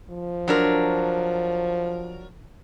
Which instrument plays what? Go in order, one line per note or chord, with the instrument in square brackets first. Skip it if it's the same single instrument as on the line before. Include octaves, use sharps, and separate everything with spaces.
[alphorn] F3
[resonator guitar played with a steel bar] F#3 D4 A#4